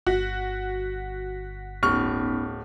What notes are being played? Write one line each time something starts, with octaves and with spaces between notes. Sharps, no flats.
G1 F#4 B6
D1 B3 C#4 D#4 C#6 F6